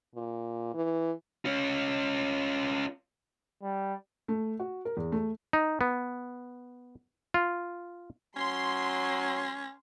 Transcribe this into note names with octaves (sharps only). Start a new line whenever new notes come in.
A#2
E3
C#4 F4
G3
A3
F#4
A#4
E2
A3
D#4
B3
F4
F#3 C#4 C6